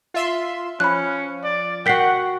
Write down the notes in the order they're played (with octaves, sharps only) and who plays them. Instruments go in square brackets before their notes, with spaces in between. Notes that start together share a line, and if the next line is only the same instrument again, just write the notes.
[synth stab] F4 E5 C6
[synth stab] F3 [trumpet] C#4 [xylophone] B5 F#6
[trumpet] D5
[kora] F#4 G5 [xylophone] A#4 B6 C7 [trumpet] F#5